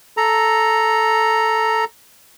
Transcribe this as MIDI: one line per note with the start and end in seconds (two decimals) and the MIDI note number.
0.17 1.85 69
0.17 1.85 82